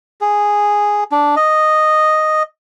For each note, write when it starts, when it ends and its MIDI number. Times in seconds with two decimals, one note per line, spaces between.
0.21 1.04 68
1.12 1.35 62
1.36 2.43 75